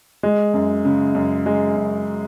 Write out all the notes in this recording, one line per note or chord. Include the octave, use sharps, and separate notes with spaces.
G#3
F#2
C#3
F#2
G#3
F#2